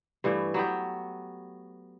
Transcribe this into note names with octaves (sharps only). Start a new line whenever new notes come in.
G2 E3 A3
F#3 B3 G4